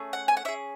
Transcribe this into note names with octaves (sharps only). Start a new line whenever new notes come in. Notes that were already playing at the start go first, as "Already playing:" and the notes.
Already playing: A3 C#4 G#4
F#5
G#5
F#5
C#4 G#4 E5